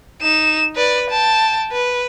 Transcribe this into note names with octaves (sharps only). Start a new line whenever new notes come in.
D#4 E7
B4 D5
G5 A5
B4